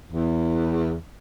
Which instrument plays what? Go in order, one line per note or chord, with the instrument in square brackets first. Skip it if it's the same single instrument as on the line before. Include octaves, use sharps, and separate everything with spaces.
[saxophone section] E2